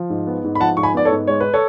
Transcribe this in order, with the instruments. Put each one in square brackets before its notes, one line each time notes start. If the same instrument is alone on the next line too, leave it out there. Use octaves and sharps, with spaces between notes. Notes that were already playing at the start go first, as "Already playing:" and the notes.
Already playing: [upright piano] F3
G#2
B3
G#2
B5
F3 F#5 A5
G#2 C#6
G#5 B5
B3 D5
A4 C#5
G#2
G#3 C#5
B4
A4 C#5